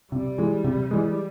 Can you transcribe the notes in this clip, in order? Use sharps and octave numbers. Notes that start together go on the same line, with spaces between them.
C3 G3
E3 G#3
C3
E3 G#3